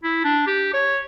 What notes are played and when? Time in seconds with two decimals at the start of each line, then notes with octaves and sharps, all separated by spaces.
0.03 E4
0.24 D4
0.47 G4
0.74 C#5